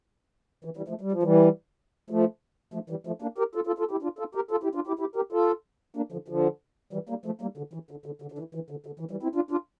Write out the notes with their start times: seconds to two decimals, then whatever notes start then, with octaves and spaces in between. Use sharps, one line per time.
0.65 E3
0.77 E3 G3
0.88 F3 A3
1.01 G3
1.12 F3
1.23 E3 G3
2.10 F3 A3
2.74 F3 A3
2.90 E3 G3
3.07 F3 A3
3.22 A#3 D4
3.38 G4 A#4
3.55 F4 A4
3.67 F4 A4
3.78 F4 A4
3.91 E4 G4
4.03 D4 F4
4.19 F4 A4
4.35 G4 A#4
4.51 F4 A4
4.63 E4 G4
4.75 D4 F4
4.87 E4 G4
4.99 E4 G4
5.15 G4 A#4
5.32 F4 A4
5.96 A#3 D4
6.12 D3 F3
6.28 D3 F3
6.93 E3 G3
7.09 G3 A#3
7.25 F3 A3
7.41 G3 A#3
7.57 D3
7.73 E3
7.91 D3
8.06 D3
8.22 D3
8.32 D3
8.38 E3
8.55 E3
8.70 D3
8.86 D3
9.00 E3
9.11 E3 G3
9.23 C4 E4
9.35 D4 F4
9.51 D4 F4